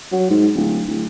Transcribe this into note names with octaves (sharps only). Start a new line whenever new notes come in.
F#3
G#2
D1
D1